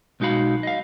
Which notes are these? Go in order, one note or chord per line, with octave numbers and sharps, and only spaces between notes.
B1 G#3 D#4 F#4 F5 B5
D#5 F5